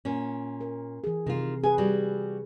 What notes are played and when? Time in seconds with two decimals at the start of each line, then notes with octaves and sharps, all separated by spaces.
0.05 A#2 C#4
0.61 A#4
1.04 E3 G#4
1.26 C3 D#3 F4
1.64 G#4 B4 G#5
1.78 G3 F#4